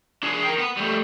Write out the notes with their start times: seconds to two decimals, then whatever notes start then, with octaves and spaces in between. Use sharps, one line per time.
0.23 D4 G#4
0.43 A#4 G5
0.58 B3
0.77 G3 A3